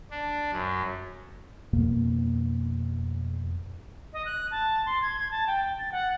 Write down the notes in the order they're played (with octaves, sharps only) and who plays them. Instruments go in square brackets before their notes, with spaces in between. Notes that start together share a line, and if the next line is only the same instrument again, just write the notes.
[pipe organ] D4
F#2
[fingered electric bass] F2 B2 A#3
[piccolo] D#5
F#6
A5
C6
G#6
G#6
A5
G5
A6
F#5